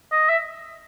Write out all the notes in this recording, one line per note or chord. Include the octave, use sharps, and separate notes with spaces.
D#5
E5